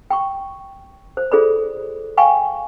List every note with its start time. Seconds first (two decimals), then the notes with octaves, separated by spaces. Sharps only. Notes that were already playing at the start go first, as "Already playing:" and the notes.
0.10 G5 B5 C#6
1.17 C5
1.32 F4 G#4 A4 C5 D5 B5
2.17 F5 G5 G#5 B5 C#6